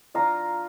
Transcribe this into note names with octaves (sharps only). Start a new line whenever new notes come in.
F3 D4 F4 F5 A#5